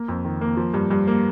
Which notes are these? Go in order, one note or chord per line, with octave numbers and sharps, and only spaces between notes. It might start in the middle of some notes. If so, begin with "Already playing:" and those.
Already playing: A#3
F2
D#3
A#3
F3
G2
G2
A#3